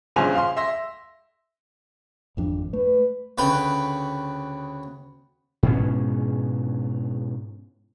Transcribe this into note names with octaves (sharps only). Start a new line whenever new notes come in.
A#1 G2 C#3 C5 G#5 F7
F5 C6
E5 C6 A#6
G#1 F2 D4
A3 B4
D2 C#3 B4 G5 B5
G#2 B2 C#4